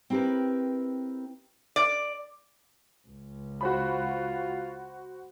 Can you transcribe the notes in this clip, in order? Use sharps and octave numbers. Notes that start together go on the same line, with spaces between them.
C4 E4 G4 A#4 B4
D5
C#2
F4 F#4 C5 B5